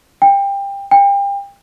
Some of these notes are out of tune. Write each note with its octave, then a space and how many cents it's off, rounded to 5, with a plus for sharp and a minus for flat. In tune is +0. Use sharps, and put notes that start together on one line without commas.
G5 +25
G5 +35